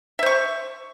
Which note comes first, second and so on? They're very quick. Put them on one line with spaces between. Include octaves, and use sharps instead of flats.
E5 C5 C#6